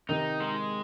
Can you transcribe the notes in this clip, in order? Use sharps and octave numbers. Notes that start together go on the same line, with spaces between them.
C3 D#3 D#4
G#3